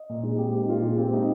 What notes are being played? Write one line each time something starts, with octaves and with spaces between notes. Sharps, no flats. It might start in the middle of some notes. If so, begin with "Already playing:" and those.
Already playing: D#5
A#2
G#3
C4 G4
D#4 G4
A#2 F4
G#3
C4 G4
D#4